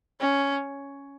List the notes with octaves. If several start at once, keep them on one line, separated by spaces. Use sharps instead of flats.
C#4